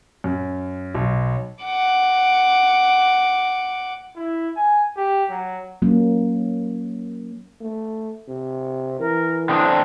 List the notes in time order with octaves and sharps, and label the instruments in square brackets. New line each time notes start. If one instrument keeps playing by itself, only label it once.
[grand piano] F#2
B1
[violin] F#5 D6
[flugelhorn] E4
G#5
G4
F#3
[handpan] F#3 A#3 C#4
[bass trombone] A3
C3
[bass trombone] E3 [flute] A#4
[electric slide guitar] D3 C4 D4 [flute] D#6